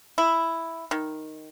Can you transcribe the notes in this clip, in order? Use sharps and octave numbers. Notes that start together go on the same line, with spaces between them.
E4
D#3